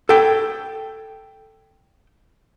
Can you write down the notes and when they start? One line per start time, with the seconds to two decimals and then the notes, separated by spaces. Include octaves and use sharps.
0.09 A4 G5